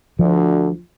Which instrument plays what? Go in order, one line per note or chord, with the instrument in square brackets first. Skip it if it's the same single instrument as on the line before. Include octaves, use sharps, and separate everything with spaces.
[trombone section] D2 [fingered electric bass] F3